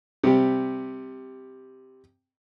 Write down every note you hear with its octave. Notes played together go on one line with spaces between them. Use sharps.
C3 G3 G4